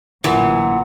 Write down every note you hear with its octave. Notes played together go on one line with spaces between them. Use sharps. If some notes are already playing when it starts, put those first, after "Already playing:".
A1 A#2 D3 E3 F#3 F#5